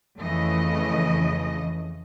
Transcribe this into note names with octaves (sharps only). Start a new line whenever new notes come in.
F2 C#3 E3 A3 D#5